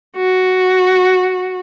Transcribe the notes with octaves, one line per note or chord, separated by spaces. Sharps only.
F#4